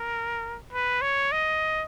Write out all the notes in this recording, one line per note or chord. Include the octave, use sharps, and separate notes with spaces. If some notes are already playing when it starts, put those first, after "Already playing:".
Already playing: A#4
B4
C#5
D#5